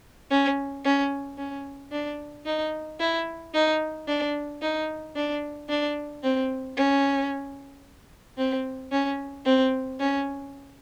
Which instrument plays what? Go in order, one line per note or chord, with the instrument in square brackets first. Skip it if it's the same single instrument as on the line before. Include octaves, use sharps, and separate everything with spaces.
[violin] C#4
C#4
C#4
D4
D#4
E4
D#4
D4
D#4
D4
D4
C4
C#4
C4
C#4
C4
C#4